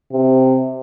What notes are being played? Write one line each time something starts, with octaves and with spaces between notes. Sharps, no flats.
C3